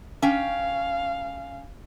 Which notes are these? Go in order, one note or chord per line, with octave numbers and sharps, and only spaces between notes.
C#4 F5 G5